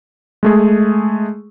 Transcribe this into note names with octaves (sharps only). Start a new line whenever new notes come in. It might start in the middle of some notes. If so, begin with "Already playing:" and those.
G#3 A3 G#4